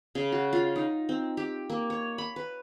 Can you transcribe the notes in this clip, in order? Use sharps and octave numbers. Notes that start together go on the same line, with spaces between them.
C#3
F#4
F4
D#4
C4
G4
A#3
C#5
B5
B4